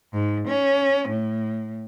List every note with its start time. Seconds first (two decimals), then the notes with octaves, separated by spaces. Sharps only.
0.13 G#2
0.47 C#4
1.08 A2